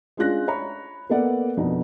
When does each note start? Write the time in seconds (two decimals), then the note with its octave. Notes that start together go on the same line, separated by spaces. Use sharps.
0.17 G#3 C#4 D4 F4 F#6 A#6
0.48 C#5 A#5 B5
1.10 A#3 B3 A4 D5 F#5
1.57 F2 B2 D4 D#4